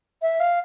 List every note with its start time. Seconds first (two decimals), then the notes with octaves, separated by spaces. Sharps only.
0.22 E5
0.40 F5